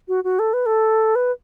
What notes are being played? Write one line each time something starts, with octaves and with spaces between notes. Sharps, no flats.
F#4
F#4
A4
B4
A4
B4